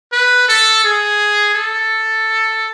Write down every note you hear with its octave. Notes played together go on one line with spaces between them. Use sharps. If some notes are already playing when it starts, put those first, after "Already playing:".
B4
A4
G#4
A4